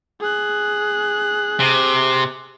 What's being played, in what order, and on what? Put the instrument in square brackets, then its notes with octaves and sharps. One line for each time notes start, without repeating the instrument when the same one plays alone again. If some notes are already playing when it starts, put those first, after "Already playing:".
[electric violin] G#4 F#6
[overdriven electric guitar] C3